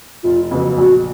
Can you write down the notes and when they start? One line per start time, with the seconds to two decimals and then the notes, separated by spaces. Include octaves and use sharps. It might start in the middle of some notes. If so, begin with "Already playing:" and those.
0.23 F1 F4
0.51 F2 C#3 F#3 B3
0.78 A#1 F#4